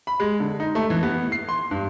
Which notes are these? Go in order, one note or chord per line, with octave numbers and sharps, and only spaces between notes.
B5
G#3
D3
D#4
A3
E3
B3
C7
C6
G2